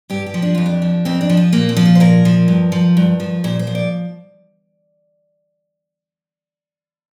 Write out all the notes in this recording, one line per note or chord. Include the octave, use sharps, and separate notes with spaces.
G2 G4
G4
F3
D4
F2 F4
D4
F3
F2 C4
D4
F3
F4
A#2 A#3
C4
F3
F4
C5
A#2 A#4
F3
G2
F3
G2
F3
A#2 C5
C5
F3
D5